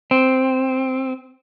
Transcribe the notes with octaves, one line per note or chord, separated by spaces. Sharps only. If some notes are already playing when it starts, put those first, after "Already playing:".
C4